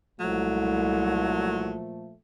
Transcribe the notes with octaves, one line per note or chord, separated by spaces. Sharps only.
C2 A#2 F3 F#3 A3